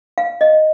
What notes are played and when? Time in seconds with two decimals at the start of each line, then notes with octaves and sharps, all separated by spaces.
0.18 F5
0.41 D#5